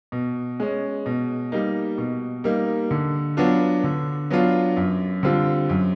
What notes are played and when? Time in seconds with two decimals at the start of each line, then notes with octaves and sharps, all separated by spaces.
0.12 B2
0.60 G#3 C#4
1.06 B2
1.52 G3 A#3 D#4
1.98 B2
2.44 G3 A#3 D#4
2.91 D3
3.37 F#3 B3 D4 F4
3.84 D3
4.30 F#3 B3 D4 F4
4.77 F#2
5.23 D3 G3 C4 F4
5.69 F#2